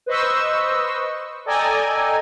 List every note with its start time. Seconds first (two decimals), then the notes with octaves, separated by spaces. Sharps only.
0.06 B4 C5 D#5 C#6 E6
1.46 A4 D5 D#5 G5 G#5 A#5